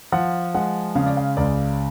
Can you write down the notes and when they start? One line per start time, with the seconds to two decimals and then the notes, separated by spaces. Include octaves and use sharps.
0.12 F3 F#5
0.55 G#3 F#5
0.95 C#3 F5
1.06 D5
1.17 F5
1.37 C#2 D5